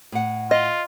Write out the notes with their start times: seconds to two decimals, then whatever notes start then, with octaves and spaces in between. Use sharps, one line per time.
0.12 A2 F#5
0.51 F4 D#5